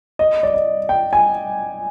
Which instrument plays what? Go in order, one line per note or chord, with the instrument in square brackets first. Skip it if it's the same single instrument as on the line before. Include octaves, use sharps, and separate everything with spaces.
[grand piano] D#5
D5
D#5
G5
G#5